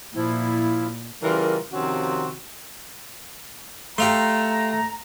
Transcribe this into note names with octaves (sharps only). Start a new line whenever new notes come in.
A#2 F3 E4
C#3 E3 G3 F4 A#4
C3 D#3 F3 C4 C#4 F#4
A3 G4 F5 A#5 C6